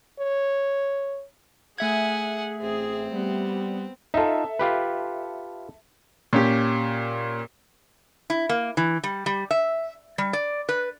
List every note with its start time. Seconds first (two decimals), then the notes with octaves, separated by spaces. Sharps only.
0.20 C#5
1.78 A3 G#4 E5 F#5 G#5 G#6
2.61 A1 C4 G#4
3.12 G3 B3
4.14 D#4 F4 A4 E5
4.59 F4 G4 B4
6.33 A#2 C#4 G4
8.30 E4
8.49 A#3
8.77 E3
9.04 G3
9.26 G3
9.51 E5
10.18 G3
10.33 D5
10.69 B4